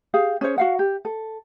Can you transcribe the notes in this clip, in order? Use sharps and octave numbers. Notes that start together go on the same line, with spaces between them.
G4 G#4 F5
C#4 G#4 C5 C#5
F#4 F5 F#5
G4
A4